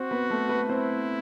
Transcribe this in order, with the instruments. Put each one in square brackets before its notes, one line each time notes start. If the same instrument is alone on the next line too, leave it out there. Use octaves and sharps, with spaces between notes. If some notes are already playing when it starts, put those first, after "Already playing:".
Already playing: [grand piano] C4 C5 [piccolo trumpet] F#4
[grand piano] B3 B4
A3 A4
B3 B4
[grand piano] C4 C5 [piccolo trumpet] E4